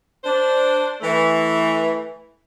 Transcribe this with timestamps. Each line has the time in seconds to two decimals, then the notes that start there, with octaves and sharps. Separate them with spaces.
0.24 D4 C5
1.01 E3 A3